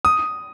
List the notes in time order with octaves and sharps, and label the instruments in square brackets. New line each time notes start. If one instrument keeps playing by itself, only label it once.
[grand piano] D#6